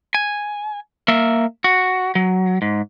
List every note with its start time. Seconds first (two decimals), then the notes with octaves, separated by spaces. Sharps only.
0.14 G#5
1.08 A#3 E5
1.64 F#4
2.15 F#3
2.62 G#2